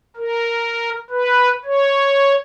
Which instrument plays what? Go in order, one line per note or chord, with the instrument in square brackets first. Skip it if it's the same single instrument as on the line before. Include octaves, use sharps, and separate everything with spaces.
[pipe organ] A#4
B4
C#5